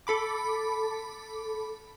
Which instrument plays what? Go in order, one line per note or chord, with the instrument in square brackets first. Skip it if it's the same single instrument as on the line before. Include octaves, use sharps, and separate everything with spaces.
[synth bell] A4 B5 D6